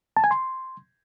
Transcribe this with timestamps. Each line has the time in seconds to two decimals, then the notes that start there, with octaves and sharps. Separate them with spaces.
0.17 A5
0.24 G#5
0.31 C6